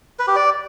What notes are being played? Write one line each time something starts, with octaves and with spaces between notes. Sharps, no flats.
B4
G4
D5